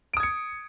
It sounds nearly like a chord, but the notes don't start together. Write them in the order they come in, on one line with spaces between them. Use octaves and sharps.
D7 D#6 G#6 C#7